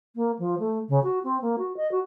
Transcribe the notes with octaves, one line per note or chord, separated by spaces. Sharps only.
A#3
F3
A3
C#3
F#4
C4
A#3
F#4
D#5
F#4